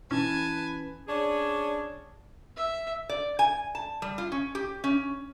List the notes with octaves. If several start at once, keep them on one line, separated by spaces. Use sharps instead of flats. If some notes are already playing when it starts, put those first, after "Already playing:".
E3 C#4 B4 G#5 A5
C#4 D4 G#4 C#5
E5
D5
G#5
A5
G3
F4
C#4
G4
C#4